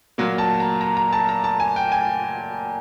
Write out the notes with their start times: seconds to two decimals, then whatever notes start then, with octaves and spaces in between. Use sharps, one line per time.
0.18 A#2 F#3 A#3
0.38 A5
0.60 A#5
0.81 A#5
0.97 A#5
1.12 A5
1.29 A#5
1.44 A5
1.60 G#5
1.76 G5
1.92 G#5